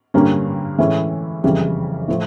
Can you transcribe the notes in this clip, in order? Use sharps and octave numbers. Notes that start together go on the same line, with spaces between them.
G2 D3 G3 A#3 C#4
A2 E3 G#3 C#4 E4
F#1 F2 C#3 E3 G3
A2 F3 A3